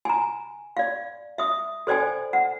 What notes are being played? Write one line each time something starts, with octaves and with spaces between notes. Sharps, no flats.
G#5 A#5
D5 F5
E5 D#6
A4 C5 D5 G5 G#5
F#5